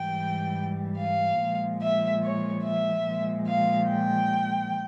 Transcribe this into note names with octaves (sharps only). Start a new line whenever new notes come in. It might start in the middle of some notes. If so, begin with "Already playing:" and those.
Already playing: G#2 E3 G3 G5
F5
A#2 F3 G#3
E5
C#5
E5
A#2 F3 G#3
F5
G5